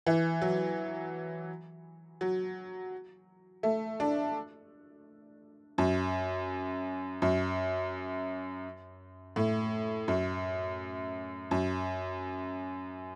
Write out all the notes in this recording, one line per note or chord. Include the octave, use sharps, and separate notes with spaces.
E3
F#3
F#3
A3
D4
F#2
F#2
A2
F#2
F#2